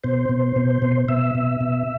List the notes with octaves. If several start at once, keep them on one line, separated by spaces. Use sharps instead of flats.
B2 C5
B2
B2
B2
B2 E5
B2
B2